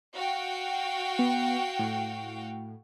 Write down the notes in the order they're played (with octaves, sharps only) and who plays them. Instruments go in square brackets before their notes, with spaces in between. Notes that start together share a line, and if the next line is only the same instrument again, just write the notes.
[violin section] F#4 F5 G5
[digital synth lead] B3
A2